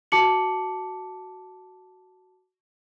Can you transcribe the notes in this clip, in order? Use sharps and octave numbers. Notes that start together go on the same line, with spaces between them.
F#4 A5 D6 C#7 F#7